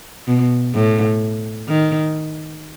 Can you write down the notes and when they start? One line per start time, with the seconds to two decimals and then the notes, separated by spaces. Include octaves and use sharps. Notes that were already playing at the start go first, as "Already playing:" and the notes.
0.27 B2
0.74 A2
1.69 D#3